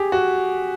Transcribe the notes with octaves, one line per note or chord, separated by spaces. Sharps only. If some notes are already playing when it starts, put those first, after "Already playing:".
Already playing: G4 G#4
F#4